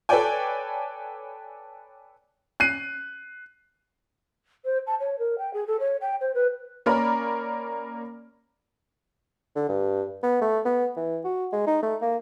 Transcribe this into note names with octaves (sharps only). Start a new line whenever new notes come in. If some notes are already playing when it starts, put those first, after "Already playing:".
A4 B4 C#5 D5 G5 G#5
F#6 C7 D#7
C5
A5
C#5
A#4
G5
G#4
A4
C#5
G5
C5
B4
A#3 C#4 A#4 D5 B5
D3
G2
B3
A3
B3
E3
F#4
G#3
D#4
A3
A#3